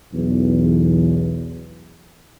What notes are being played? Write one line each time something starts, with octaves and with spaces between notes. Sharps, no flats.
B1 E2